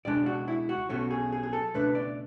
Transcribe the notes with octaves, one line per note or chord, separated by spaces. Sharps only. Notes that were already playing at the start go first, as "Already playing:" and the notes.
C#2 B2 G#3 D4 D5
F#4
E4
F#4
B1 B2 A3 C#4 F#4
G#4
G#4
G#4
A4
C#2 B2 A3 D4 B4
D5